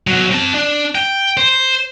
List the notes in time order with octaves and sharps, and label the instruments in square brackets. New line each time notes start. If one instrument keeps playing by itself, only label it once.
[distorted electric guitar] B2 F#3
C4 A5
D4
G5
C5